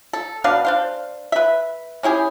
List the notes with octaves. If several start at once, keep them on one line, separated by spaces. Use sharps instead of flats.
A4
B2 D4 B4 F5
D4 C5 F5
B4 E5
C#4 E4 G4 G#4